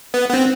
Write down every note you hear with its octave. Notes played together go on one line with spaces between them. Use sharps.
B3
B3
C4